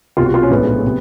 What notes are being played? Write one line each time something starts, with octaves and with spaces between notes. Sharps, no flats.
C2 B2 G3 F4
F#4
F4
C#4
A#1 A2 F3 G#3 B3
C3